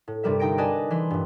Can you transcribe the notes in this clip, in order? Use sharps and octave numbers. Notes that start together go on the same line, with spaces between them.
A2
G2 C3 G3 A#4 E5
G1 D#4 G5 A#6 D7
B4 D5 D#5 G#5 A5
E3 B4 C6
G2 A#2